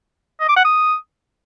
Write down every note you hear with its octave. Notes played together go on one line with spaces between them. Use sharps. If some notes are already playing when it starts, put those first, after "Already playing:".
D#5
D6
F#5
D#6